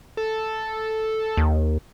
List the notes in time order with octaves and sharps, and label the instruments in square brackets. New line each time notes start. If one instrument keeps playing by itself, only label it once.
[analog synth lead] A4
[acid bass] D#2